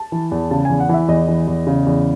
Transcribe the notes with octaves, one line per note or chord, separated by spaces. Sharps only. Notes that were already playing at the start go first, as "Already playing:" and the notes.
Already playing: A5
E3
E2
C#3 A5
E2 G#5
F#5
E3 E5
E2 D#5
E3
E2
C#3
E2